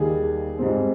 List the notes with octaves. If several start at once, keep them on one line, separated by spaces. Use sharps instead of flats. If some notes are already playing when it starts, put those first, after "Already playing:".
Already playing: D#2 D#3 G3 G#4
G#2 G3 C4